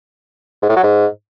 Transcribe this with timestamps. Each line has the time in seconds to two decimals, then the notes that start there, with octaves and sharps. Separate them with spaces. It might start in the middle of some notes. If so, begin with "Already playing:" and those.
0.62 G#2
0.69 A2
0.76 F#3
0.83 G#2